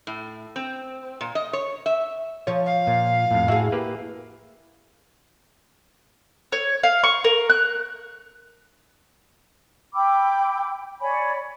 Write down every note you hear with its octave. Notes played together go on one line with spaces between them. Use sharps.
A2
C4
A#2
D#5
C#5
E5
F3 F4 C#5
F5
A#2
F2 A2
A2 E4 F#4 G#4 E5
A#3 G4 B4
C#5
F5
C#6
A#4
F#6
G5 B5 D6 E6
C#5 D5 G#5 B5